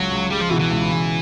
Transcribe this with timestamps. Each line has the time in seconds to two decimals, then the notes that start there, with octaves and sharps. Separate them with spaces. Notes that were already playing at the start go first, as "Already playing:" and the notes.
Already playing: C#2 F#3
0.11 C#2
0.31 G3 G#3
0.41 F3
0.51 B2 E3
0.61 E3
0.71 C#2
0.92 C#2